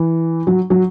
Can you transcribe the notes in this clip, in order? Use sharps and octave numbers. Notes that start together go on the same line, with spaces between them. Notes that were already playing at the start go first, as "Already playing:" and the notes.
Already playing: E3
F#3
F#3